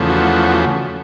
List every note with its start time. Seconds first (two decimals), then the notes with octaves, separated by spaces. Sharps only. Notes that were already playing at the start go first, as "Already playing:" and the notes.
Already playing: E2 C#3 F3 A3
0.09 F#4